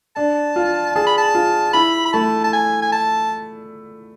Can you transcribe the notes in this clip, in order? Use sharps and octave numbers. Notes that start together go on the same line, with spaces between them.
D4 A5
F4
G#4 A5
B5
A5
F4
E4 B5
B5
A3 A5
A5
G#5
G#5
A5